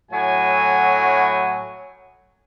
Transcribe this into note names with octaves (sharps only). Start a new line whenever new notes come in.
A2 F#3 G#5